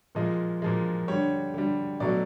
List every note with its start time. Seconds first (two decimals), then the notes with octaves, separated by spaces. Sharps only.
0.15 A#2 F3 G#3 D#5
0.62 A#2 F3 G#3
1.08 D3 G3 C#5
1.54 D3 G3
2.00 B2 F#3 A3 D5